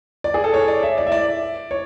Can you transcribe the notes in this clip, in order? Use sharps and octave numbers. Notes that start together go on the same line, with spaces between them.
D5
G#4
A4
C#5
D5
E5
D5
E5
D5
C#5